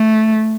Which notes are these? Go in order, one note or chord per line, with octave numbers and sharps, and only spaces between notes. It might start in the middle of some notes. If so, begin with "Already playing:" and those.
Already playing: A3